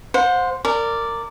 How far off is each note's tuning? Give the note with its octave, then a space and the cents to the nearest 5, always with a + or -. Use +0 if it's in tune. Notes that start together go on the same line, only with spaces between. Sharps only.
C5 +0 F#5 -40
A#4 -20 D5 +0